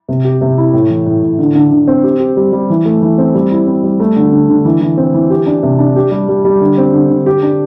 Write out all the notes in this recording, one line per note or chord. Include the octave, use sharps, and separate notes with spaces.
C3
G4
C3
E4
A2
E3
A2
A2
D3
D3
D3
C4
G4
G4
G3
G3
E3
A3
E3
C4
G3
E4
C4
G3
A3
D3
D3
D3
E3
E3
C4
E3
G4
D4
C3
D4
G4
G3
G3
G3
D3
C4
D3
D3
G4
D4